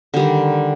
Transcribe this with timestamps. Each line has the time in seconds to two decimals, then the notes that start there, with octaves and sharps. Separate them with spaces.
0.14 D3
0.16 G3
0.19 D#3